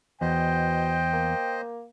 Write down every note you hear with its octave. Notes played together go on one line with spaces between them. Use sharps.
E2 B2 C5 D#5 G5
A#3